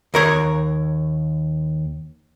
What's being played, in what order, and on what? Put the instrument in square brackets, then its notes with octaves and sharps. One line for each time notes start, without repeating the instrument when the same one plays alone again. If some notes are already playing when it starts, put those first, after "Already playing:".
[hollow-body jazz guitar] D#2 A#4 C#5